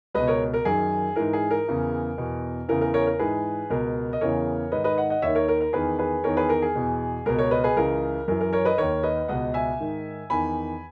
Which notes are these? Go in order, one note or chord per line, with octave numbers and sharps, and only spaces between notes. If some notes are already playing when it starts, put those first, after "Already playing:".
C#2 B2 B4 D#5
A#4 C#5
A#4
F#2 D#3 G#4
G#2 E3 A#4
G#4
A#4
E2 C#3 E3
E2 B2
E2 C#3 E3 A#4
A#4
A#4 C#5
A#4
G#2 E3 G#4 B4
C#2 B2 A#4
D#5
E2 C#3 E3 A#4 C#5
G#2 D#3 B4 D#5
B4 D#5
D#5 F#5
D#5 F#5
D#2 C#5 E5
D#3
A#4 C#5
A#4
A#4
E2 D#3 G#4 B4
G#4 B4
E2 D#3 A#4 C#5
G#4 B4
A#4
G#4
E2 B2
C#2 B2 A#4
A#4 C#5
B4 D#5
G#4 B4
C#2 C#3 E3 A#4
F#2 E3 A#4
A#4
A#4 C#5
B4 D#5
D#2 D#3 A#4 C#5
B4 D#5
C#2 B2 D#5 F#5
E5 G#5
G#2 D#3
E2 D#3 G#5 B5